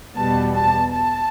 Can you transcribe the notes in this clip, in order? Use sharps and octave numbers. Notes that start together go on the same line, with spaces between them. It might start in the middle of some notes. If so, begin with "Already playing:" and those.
E2 B2 G3 B3 A5
A5
A5